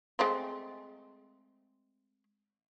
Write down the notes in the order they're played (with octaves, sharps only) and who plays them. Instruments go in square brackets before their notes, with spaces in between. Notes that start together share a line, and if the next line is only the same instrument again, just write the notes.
[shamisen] G#3 A3 C4